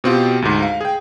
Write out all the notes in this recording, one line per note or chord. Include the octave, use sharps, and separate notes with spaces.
B2 C4 F4 G4
D2 G#2
F5
G#4 G5